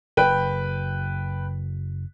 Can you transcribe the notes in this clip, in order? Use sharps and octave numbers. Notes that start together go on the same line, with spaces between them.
F#1 B4 G5